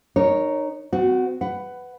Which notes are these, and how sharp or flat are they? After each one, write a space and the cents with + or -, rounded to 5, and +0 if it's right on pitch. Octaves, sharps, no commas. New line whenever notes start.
D#4 -30 A#4 +0 C#5 +0
C4 -40 F#4 +0
B4 +15 F#5 +10